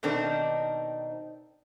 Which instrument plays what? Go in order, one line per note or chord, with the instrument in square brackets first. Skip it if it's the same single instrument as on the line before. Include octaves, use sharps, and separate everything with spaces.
[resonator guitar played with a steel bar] B2 D#3 C4 D4 D#4 A#4